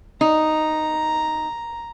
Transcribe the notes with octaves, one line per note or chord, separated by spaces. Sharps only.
D#4 A#5